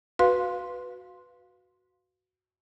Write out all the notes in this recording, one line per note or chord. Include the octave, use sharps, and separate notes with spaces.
F#4 B4 F5 C6